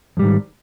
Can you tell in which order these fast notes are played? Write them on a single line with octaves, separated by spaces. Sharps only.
F2 G3 G#2 D#3